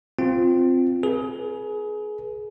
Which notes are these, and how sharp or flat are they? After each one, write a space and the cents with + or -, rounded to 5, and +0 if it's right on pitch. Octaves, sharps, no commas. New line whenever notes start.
C4 +0 F4 +0
G#4 +25 B4 -40